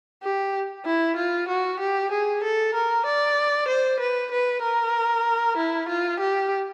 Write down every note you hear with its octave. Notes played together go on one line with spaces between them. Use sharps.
G4
E4
F4
F#4
G4
G#4
A4
A#4
D5
C5
B4
B4
A#4
E4
F4
G4